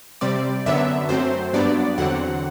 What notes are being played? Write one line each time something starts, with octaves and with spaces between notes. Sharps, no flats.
C3 G3 C4 D5
F#2 D3 F#3 B3 D4 E5
F#2 F#3 A3 C4 C5
G2 F#3 B3 D4 D5
E2 D3 F#3 C4 F#5